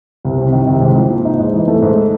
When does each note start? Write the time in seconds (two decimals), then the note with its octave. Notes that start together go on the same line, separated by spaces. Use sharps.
0.25 C2
0.38 C3
0.53 D#3
0.67 C2
0.81 G#2
0.95 F3
1.10 A#3
1.25 D#4
1.39 G#2
1.54 E3
1.68 A3
1.82 G#2